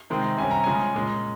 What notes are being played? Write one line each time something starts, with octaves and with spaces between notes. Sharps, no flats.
C3 D#3 G#3 C4
C3 G3 C#4 G#5
A#5
C#3 F3 G#3 C#4 G#5
A#2 G#3 C#4